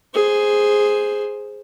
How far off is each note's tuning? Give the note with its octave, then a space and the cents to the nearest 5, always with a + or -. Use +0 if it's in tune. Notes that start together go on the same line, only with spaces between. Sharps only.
G#4 +0 C5 +0